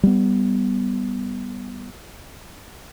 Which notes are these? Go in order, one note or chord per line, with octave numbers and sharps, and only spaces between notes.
G3 B3